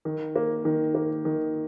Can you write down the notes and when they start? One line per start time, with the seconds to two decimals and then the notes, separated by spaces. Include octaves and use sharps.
0.05 D#3
0.36 A#3
0.65 D#3
0.95 A#3
1.25 D#3